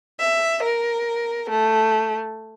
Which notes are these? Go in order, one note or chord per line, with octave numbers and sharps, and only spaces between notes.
E5
A#4
A3